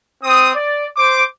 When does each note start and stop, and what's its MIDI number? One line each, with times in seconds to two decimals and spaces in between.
0.22 0.50 60
0.22 0.50 87
0.55 0.85 74
0.96 1.23 72
0.96 1.23 86